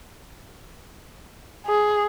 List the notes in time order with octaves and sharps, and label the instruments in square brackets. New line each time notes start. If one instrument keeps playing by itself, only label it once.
[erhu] G#4